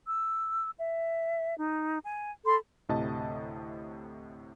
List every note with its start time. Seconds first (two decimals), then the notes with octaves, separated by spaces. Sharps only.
0.06 E6
0.78 E5
1.58 D#4
2.04 G#5
2.44 A4 B5 C6
2.89 D2 A2 C3 D#5 A5